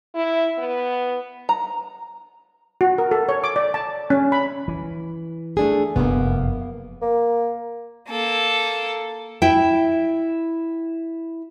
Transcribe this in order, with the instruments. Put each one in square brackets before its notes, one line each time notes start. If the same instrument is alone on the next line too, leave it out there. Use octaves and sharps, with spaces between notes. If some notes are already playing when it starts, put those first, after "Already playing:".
[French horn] E4
B3
[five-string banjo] A#5
[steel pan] F#4
A#4
A4
C#5
D6
D5
A5
C#4
B5
[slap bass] E3
[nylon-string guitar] A3 D4 G#4
[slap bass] F1 F#2 [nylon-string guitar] A#3 B3
[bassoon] A#3
[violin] A#3 A4
[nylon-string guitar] E4 G5